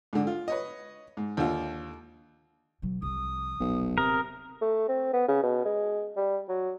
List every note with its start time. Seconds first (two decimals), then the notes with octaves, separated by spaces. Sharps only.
0.13 G#2 D3
0.27 F4
0.48 B4 C#5 D#5
1.17 G#2
1.37 D#2 D3 F4
2.82 B2 F#3
3.02 C2 F3 D#6
3.60 D#1 B1
3.98 C3 A#4 D#6
4.62 A3
4.89 C4
5.13 B3
5.28 C#3
5.43 B2
5.65 G#3
6.16 G3
6.48 F#3